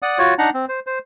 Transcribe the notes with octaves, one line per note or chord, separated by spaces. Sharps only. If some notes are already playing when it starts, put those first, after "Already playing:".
D5 F#5 D#6
F4 F#4 C#5
D4 D#4 F#5 A#5
C4
C5
C5